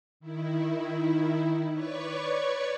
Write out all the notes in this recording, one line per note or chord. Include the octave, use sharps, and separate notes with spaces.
D#3 E4
B4 C#5 D5 C#6